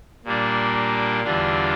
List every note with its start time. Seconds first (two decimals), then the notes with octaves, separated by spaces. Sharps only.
0.25 A#2 G3 A#3 D4
1.24 E2 D3 G3 D4 F4